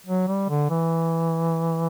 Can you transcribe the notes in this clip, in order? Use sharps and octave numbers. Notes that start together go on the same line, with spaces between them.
F#3
G3
D3
E3